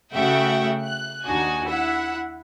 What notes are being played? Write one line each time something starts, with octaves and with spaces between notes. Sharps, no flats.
C#3 A3 F#4 E5 F#5 G5
F#6
D#2 D4 D#4 F#4 G#5
E4 E5 F#5